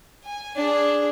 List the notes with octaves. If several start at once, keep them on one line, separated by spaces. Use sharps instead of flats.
G#5
D4 G#4